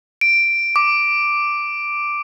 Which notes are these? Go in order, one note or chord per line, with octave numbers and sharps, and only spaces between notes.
D7
D6